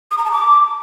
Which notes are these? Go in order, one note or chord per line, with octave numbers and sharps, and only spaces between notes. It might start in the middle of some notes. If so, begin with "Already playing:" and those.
D#6
A#5
A5
D6